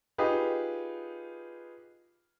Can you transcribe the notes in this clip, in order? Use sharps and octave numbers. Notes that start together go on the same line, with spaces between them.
D#4 F4 G4 G#4 B4